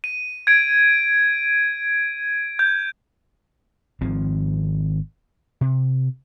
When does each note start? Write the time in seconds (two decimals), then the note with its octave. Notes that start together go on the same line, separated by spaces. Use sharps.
0.04 D#7
0.47 G#6 D7
2.59 G6
4.01 G#1 D#3 F3 C4
5.61 C3